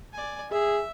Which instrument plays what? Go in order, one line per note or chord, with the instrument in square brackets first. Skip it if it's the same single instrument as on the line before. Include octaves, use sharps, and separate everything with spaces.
[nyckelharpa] D5 G#5
[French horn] G#4 [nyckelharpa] E5